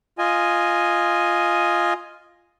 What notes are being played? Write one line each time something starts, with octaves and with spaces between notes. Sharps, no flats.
F4 D#5 G#5